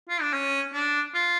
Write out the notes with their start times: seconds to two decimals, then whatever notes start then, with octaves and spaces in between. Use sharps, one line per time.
0.09 F4
0.21 D4
0.33 C#4
0.73 D4
1.14 F4